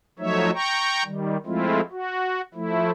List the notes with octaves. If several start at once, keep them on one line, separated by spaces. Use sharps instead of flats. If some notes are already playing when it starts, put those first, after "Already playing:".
F3 F#3 A3 D#4 C#5 E5
G5 A#5 C#6
D#3 G3
F3 G#3 A3 C4 E4 F4
F#4
F3 A3 E4